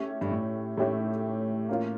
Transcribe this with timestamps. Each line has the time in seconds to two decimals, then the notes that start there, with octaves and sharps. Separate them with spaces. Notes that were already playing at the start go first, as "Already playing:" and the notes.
Already playing: A3 C#4 G4 C#5 E5
0.21 G2
0.31 A2
0.77 A2 A3 C#4 G4 C#5 E5
1.69 A#3 C#4 F4